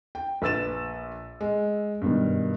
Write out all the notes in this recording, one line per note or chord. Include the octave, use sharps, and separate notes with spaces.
G5
A#1 B4 E6 A6 E7
G#3
G2 B2 D#3